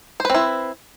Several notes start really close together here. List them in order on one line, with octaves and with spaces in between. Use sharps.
C5 B4 C4 E4